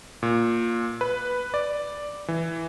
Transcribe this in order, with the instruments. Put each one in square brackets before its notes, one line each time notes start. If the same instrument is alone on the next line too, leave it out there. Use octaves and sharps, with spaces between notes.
[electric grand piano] A#2
B4
D5
E3